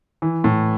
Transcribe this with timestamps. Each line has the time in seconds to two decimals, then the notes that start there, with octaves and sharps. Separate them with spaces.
0.22 E3
0.44 A2